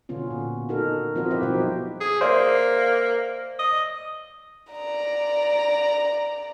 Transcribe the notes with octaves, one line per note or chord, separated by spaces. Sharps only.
B2 D3 B3 C#4 F4
A#2
D#4 F#4 A4 A#4
F3 C4 F4 F#4 A#4 D#5
E4 F#4 G4 B4 E5
B2 F3 F#3 D#4 G4 C5
G#4
A#3 C5 D5 E5
D#5
D5 A#5